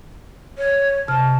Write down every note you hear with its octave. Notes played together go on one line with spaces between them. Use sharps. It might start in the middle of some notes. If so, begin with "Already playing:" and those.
C#5
C3 A5 F6